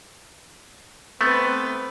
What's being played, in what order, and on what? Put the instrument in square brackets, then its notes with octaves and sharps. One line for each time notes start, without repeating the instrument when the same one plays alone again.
[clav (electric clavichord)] A3 B3 [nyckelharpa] C4 B4